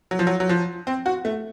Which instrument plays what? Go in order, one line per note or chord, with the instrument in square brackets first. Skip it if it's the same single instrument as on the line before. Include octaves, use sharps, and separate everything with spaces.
[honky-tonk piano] F#3
F3
F#3
F#3
F3
C4
F#4
A3